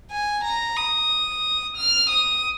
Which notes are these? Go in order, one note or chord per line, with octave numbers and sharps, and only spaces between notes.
G#5
A#5
D#6
F6
D#6